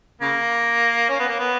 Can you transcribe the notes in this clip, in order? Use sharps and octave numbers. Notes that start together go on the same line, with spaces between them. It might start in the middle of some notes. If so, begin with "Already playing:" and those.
C#3 A#3
C#4
B3
A#3
B3